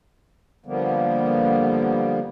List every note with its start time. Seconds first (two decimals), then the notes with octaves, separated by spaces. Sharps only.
0.66 D3 F3 G3 A#3 B3